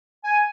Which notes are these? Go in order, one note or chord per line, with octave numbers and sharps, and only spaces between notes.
G#5